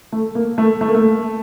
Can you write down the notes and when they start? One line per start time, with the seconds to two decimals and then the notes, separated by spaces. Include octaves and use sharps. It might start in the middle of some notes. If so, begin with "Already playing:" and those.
0.12 A3
0.35 A#3
0.58 A3
0.81 A3
0.88 A#3
0.95 A3